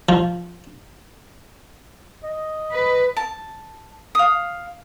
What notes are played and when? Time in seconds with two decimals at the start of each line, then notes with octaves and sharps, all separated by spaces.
0.09 F3
2.24 D#5
2.73 B4
3.17 A5
4.15 F5 D#6